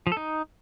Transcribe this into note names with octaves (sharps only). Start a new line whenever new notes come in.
F3
A4
D#4